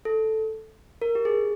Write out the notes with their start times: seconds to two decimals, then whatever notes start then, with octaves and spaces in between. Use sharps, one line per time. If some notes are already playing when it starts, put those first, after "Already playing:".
0.05 A4
1.02 A#4
1.15 G4
1.25 G#4